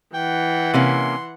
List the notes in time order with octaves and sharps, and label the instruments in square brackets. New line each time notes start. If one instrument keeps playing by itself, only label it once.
[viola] E3 F#5 [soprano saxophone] G5
[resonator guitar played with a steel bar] C3 A#3 C#4 [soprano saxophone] C6